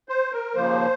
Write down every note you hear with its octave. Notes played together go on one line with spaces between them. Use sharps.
C5
A#4
D#2 C#3 F3 A#3 C5